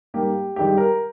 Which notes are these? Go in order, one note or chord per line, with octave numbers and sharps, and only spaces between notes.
G#2 G3 A#3 G4
G2 D#3 G#3 G4
A#4